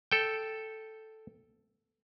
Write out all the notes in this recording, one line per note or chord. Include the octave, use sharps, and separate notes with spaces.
A4 G5